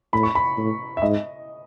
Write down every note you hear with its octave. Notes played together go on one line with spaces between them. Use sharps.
A2 B5
C#6
B5
A2
E5
G#2 D#5